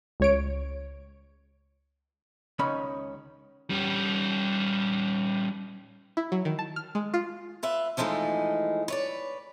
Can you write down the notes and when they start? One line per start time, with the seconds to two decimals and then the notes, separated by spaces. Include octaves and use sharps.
0.20 C#2 C#5 D7
2.59 C#2 D#3 C#4 D#5 B5
3.70 G3 C#4
6.17 E4
6.32 F#3
6.45 D#3
6.59 A5
6.76 F6
6.95 G#3
7.14 F4
7.63 F4 B4 E5
7.97 E3 F3 G#3 A3 D#4
8.88 B4 C#5 D5